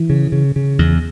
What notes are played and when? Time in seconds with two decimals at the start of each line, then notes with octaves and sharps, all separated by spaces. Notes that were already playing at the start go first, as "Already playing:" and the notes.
Already playing: E3
0.10 C#3
0.32 C#3
0.56 C#3
0.79 E2